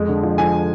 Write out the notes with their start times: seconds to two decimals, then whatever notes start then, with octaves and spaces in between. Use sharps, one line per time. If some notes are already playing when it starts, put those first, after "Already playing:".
Already playing: F2 G#3
0.08 D3
0.23 F3
0.38 F3 G#5